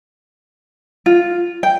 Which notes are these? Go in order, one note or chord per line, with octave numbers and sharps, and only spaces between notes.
F4
G5